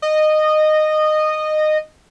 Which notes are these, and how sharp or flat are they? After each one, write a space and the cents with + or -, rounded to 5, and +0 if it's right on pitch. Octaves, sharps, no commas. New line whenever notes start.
D#5 -15